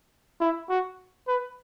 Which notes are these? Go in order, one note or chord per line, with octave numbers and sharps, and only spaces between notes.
E4
F#4
B4